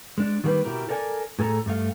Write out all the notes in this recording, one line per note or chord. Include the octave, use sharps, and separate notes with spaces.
G#3 D4
D#3 G3 A#3 G#4 B4
B2 E4 G4 A#4
A4 A#4 D5 F#5 G#5
A2 G#4 A4 A#5
G2 A3 F5